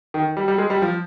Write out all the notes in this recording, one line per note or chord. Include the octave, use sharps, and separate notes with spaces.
D#3
G3
G3
G#3
G3
F3